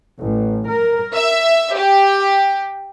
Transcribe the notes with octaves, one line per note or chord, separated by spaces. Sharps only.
A1
A#4
E5
G4